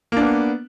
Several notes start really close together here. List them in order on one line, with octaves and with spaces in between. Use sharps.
A#3 D4 B3